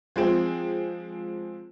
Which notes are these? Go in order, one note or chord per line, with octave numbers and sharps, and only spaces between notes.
F3 G#3 C4